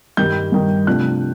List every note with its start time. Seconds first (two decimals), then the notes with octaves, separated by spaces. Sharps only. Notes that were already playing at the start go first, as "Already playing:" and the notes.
0.17 G2 D#3 G3 G6
0.52 G2 D#3 G3
0.87 C3 F3 A3 D4 F#6